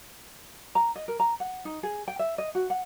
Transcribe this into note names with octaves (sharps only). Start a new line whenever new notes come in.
A#5
D#5
A#4
A#5
F#5
D#4
G#4
G5
E5
D#5
F#4
F#5